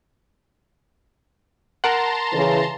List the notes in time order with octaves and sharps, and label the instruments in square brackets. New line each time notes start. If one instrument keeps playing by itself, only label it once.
[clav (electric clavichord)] A#4 F#5 [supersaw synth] A5 A#5 C6
[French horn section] C#3 E3